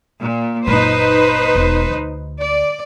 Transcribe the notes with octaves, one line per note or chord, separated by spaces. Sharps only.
A#2
F#1 A#2 D#4 B4 C5
E1
D2
D5